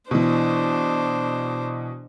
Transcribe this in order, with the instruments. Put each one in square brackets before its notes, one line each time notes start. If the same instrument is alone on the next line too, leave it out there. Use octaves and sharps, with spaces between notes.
[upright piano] B2 E3 [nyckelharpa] D4 C5